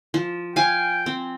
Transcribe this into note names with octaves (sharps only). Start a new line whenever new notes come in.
F3
F5 G5 G#5
C4